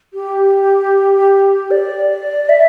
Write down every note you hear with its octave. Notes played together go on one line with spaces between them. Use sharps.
G4
D5
E5